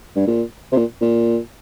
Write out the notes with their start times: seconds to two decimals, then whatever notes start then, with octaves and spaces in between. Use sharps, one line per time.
0.16 G2
0.27 A#2
0.72 C3
0.77 A#2
1.01 A#2